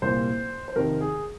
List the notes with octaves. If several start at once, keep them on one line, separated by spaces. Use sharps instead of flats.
C2 A#2 A#3 C5
C5
F2 C3 D#3 A#4
G#4